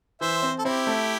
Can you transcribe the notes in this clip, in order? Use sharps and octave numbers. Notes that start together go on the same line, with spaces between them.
E3 C5 E5
C4
A4
C4 E4 G4
A3